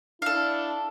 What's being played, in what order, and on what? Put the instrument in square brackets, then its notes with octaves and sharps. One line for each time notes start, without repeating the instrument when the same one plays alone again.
[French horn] D4 [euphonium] E4 [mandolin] A4 F5